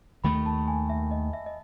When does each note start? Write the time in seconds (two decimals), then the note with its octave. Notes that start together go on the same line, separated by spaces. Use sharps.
0.24 D#2 D#3 A3 B5
0.46 A5
0.68 G#5
0.90 E5
1.11 D#5
1.33 E5
1.46 D#5